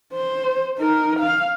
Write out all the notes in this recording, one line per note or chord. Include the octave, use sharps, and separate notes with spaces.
C5
D#4 A#4
F5